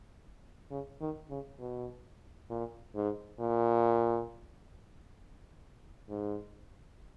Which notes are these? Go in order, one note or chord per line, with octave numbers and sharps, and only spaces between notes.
C#3
D#3
C#3
B2
A#2
G#2
A#2
G#2